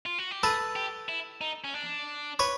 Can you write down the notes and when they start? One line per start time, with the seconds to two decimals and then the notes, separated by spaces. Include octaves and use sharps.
0.06 F4
0.18 F#4
0.31 G4
0.43 G#4 A4 B4
0.76 G4
1.09 E4
1.41 D#4
1.64 C#4
1.74 D4
2.39 B4 C#5